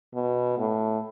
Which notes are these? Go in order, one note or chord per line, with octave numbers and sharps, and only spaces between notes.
B2
A2